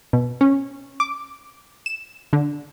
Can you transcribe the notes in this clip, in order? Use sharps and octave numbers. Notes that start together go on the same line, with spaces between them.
B2
C#4
D6
E7
D3